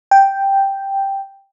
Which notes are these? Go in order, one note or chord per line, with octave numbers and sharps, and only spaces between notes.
G5